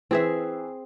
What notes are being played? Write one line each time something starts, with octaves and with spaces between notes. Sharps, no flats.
E3 C4 G#4 E5